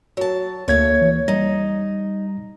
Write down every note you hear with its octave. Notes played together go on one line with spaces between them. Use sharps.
F#3 A5
D2 A3 A#3 C#5 G#6
E3
G3 D#4 A#6